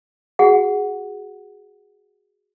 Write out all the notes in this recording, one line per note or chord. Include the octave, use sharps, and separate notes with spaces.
F#4 G#4 F#5